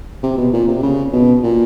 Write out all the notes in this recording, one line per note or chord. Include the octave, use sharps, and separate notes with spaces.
C3
B2
A#2
C3
C#3
B2
A#2